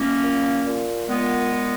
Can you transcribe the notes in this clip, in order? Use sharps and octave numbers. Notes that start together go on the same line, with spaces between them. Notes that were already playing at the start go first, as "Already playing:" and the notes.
Already playing: B2 A#3 C#4
A#2
A#2
A#2 G#3 B3
A#2